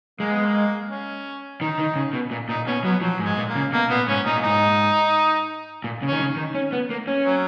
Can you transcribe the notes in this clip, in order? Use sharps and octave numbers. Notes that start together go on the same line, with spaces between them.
G#3 A#3
B3
A#3
C#4
D#3 D#4
D#3
C#3
B2
A#2
A#2 D#4
B2 C#4
F#3 B3
F3 F#3
G#2
G#3
A#2
A#3
C#3
B2 A#3
A#2 B3
G#2 C#4
A#2 D#4
A#2
G#2 D#4
A#2
C#3
D#3 C#4
C#3
D#3
C#4
B3
A#3
C#4
F#3